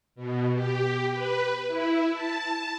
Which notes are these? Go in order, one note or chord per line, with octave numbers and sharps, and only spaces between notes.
B2
G4
B4
E4
A5